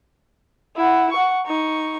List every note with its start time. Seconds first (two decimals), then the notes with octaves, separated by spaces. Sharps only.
0.76 E4 F#5
1.12 F#5 C#6
1.46 D#4 C#6